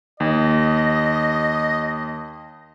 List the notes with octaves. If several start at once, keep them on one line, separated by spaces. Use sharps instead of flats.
D#2 D#5